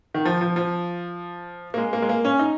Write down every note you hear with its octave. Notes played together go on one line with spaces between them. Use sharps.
D#3
F3
F3
F3
A#3
G#3
A#3
G#3
A#3
C#4
D#4